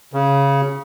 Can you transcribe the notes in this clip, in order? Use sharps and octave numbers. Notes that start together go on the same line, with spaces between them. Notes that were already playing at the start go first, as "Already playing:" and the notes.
C#3